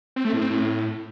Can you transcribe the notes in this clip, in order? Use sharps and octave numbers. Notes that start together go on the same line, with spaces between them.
C4
A3
A2
C4
A2